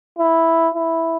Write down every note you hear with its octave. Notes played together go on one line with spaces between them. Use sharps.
E4
E4